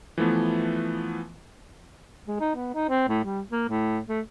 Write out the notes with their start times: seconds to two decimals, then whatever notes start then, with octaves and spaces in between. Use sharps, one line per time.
0.18 E3 F3 A3 B3
2.27 G#3
2.40 D#4
2.55 B3
2.75 D#4
2.89 C4
3.08 A2
3.24 G3
3.50 A#3
3.69 A2
4.08 A3